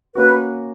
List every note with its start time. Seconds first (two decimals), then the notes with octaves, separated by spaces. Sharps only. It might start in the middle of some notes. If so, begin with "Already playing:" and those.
0.15 A#3 C#4 F#4 B4